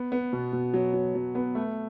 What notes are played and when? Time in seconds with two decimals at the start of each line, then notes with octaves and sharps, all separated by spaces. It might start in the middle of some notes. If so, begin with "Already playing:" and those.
Already playing: B3
0.12 B3
0.33 B2
0.53 B2
0.74 F#3
0.94 F#3
1.15 F#3
1.35 B3
1.55 A3